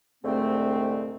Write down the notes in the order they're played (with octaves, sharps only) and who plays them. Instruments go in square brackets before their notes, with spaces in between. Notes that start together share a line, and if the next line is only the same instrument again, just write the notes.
[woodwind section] C2 G#2 D3 A3 C4